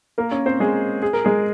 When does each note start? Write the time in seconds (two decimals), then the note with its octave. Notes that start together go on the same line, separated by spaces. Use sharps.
0.18 A#3 A#4
0.31 C#4 C#5
0.46 C4 C5
0.60 G#3 G#4
1.02 G#4
1.13 A#4
1.25 G#3 G#4